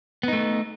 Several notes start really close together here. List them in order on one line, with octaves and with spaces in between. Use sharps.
B3 D#4 A3